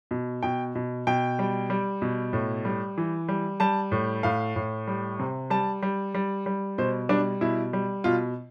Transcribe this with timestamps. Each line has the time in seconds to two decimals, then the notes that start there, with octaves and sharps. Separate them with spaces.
0.11 B2
0.43 B2 G5
0.75 B2
1.07 B2 G5
1.39 G3
1.70 G3
2.02 B2
2.33 A2
2.65 G3
2.98 E3
3.28 G3
3.60 G3 A5
3.92 A2
4.23 A2 F5
4.56 A2
4.87 G3
5.19 C3
5.50 G3 A5
5.82 G3
6.14 G3
6.46 G3
6.78 B2 C5
7.09 G3 D4
7.41 B2 E4
7.73 G3
8.04 B2 F4